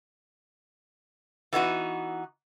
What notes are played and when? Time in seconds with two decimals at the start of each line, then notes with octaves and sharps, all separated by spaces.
1.53 E3 B3 D#4 F#4